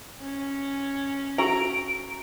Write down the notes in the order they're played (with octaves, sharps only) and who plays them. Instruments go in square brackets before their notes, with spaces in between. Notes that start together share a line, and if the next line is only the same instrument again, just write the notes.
[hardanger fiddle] C#4
[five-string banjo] F#4 A4 A#5 [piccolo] D7